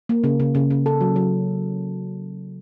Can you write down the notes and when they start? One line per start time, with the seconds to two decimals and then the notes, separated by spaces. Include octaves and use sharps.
0.09 A#3
0.24 C#3
0.40 C#3
0.55 C#3
0.70 C#3
0.86 A4
1.01 F#3
1.16 F#3